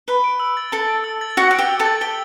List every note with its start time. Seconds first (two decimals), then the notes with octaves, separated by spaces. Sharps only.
0.08 B4 B5 G7
0.24 D7
0.40 E6
0.57 A6
0.72 A4 A5 G7
0.88 D7
1.04 E6
1.21 A6
1.37 F#4 F#5 G7
1.51 F#5 D7
1.58 G4 G5
1.69 E6
1.79 A4 A5
1.86 A6
2.01 G4 G5 G7